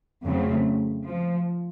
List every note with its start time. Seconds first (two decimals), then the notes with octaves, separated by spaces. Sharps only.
0.24 F2 C#3 F#3 A3 C4
1.05 F3